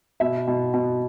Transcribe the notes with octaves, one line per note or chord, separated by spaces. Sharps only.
B2 E5
B2
B2